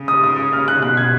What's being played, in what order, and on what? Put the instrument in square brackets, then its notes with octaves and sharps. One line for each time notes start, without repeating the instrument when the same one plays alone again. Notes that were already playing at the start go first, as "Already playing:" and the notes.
Already playing: [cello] C#3
[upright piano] D#6
D#6
F6
F#6
[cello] B2 [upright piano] F#6
[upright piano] G#6